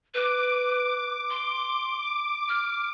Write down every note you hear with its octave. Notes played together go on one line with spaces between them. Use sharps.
B4 D6
C6
F6